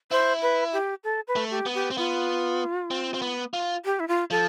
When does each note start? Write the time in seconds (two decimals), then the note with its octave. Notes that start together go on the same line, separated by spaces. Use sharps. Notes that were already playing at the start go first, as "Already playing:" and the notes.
0.11 E4 C5
0.42 B4
0.73 G4
1.04 A4
1.28 B4
1.36 A3
1.50 G4
1.66 B3
1.75 G4
1.91 C4
1.98 B3 F4
2.91 C4
3.14 C4
3.22 B3
3.54 F4
3.85 G4
4.00 E4
4.08 F4
4.30 F3 A4